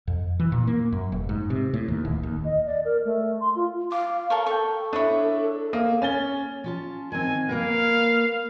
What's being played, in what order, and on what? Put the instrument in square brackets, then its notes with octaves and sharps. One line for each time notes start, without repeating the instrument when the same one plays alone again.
[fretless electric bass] F2
E3
A#2
A#3
F#2
F1
G#2
C3
A2
D#2
D1
D#2
[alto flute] D#5
D5
A#4
A3
C6
F4
[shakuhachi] F5 [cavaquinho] D6
[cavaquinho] A4 A#4 C#5
[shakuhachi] A4 [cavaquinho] G5 C#6
[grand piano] D4 E4 [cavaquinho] C#5 D#6
[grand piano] A#3 [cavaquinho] D#6
[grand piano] C#4 A6 G7
[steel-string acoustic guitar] C#4 F4 A5
[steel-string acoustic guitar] D#3 C4 [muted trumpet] G#5
[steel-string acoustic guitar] A#3 A#4 B4 [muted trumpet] F5